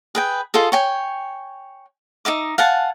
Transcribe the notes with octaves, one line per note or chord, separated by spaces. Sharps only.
G#4 B4 G5
F4 G#4 A4 D#5
C#5 G5 G#5
D#4 D#5 E5 D6
F5 F#5 G#5 A5